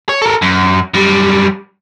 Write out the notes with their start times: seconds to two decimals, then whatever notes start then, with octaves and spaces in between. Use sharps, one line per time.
0.09 C#5
0.22 A4 A#4
0.42 F#2
0.94 F#2 G3